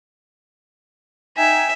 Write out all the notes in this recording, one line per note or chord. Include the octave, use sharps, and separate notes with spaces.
D#4 E5 G5 G#5